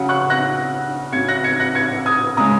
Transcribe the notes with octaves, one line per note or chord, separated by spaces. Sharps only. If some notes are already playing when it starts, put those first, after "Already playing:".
Already playing: C#3 F#3 F#5
C#6 F#6
F#6 A#6
C#3 F#3 G#6 C#7
F#6 A#6
G#6 C#7
F#6 A#6
G#6 C#7
D#6 G#6
C#3 G#3 A#5 D#6